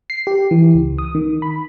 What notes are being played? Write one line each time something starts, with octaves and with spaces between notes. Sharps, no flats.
C7
G4
E3
C#2
D#6
D#3
B5